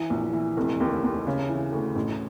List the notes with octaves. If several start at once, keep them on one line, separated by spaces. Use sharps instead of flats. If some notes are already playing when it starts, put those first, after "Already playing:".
Already playing: E3
A#1
E3
F1
D#2
D#2
C#3
E3
D2
A1